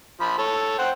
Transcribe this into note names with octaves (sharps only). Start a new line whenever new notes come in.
F3 B5
A4 C#5
C5 F#5 G5